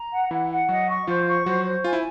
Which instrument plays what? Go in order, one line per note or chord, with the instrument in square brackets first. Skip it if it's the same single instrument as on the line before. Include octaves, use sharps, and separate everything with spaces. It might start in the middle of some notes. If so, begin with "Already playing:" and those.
Already playing: [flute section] A#5
F#5
[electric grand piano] E3 E4 [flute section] F#5
[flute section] F#5
[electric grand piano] F#3 F#4 [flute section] D#5
[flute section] C#6
[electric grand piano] F3 F4 [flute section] C5
[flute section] C#6
[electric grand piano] F#3 F#4 [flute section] C5
[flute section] C5
[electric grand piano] F4 [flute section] G#5
[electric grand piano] E4